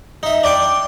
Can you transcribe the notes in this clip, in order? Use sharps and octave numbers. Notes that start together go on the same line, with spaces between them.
D#4 E5
D4 D5 G5 C6